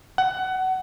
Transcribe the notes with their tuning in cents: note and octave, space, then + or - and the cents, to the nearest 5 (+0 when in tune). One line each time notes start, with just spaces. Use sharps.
F#5 +20